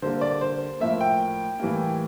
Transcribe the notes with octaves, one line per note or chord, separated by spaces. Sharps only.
D3 G3 A#3 C5
D5
C5
A2 F3 A#3 E5
G5
A2 E3 G3 A#3